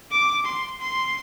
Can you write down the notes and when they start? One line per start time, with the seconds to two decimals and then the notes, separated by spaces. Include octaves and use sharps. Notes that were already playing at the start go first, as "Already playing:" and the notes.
0.11 D6
0.45 C6
0.80 C6